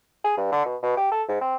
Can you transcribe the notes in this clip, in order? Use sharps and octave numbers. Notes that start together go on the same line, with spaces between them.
G#4
G2
D3
B2
B2
G4
A4
G#2
C4